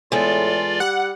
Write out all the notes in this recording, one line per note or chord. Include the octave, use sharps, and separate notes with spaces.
E2 A2 G#3 F4 A4 D5
G3 F#5